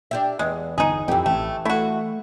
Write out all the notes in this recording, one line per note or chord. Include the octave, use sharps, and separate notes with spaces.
D4 G4 E5
E2 G#3
G1 D#4 G#4
F2 E3 G4
A1 A3
A3 E4 F#4